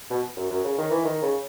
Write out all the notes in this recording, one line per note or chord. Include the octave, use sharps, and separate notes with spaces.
B2
F#2
F#2
C#3
D#3
E3
D#3
C#3